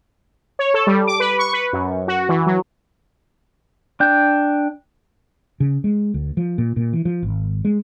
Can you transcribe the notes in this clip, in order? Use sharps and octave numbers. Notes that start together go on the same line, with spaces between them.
C#5
A4
G3
D6
B4
C#6
B4
F#2
F#4
E3
F#3
D4 G5
C#3
G#3
D2
F3
A#2
A#2
E3
F3
G#1
G#3